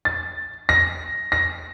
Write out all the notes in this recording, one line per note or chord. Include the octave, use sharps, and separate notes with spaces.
A6
A#6
A#6